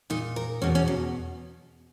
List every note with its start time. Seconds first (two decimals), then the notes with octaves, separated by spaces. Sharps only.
0.10 A#2 D#4
0.36 A#4
0.62 E2 B2 C#4
0.75 C#4
0.88 F#3